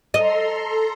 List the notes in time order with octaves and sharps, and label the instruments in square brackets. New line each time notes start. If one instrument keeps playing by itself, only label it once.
[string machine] A4 A#5 C6 [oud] D#5